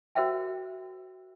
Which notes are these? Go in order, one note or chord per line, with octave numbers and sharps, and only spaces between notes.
F#4 A#4 C5 E5 F#5 G5